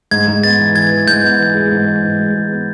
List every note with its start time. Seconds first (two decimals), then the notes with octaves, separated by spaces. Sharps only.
0.11 G#2 G#6
0.28 G#2
0.43 B3 A6
0.59 E3
0.75 E3 G#6
0.91 E3
1.07 G#2 G6
1.23 B3
1.39 E3
1.54 G#3
1.70 G#2
1.86 E3
2.03 G#2
2.19 G#3
2.35 G#3
2.50 B3